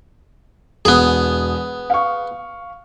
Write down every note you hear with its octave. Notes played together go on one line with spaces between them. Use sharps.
E1 B3 G#4
F5 C#6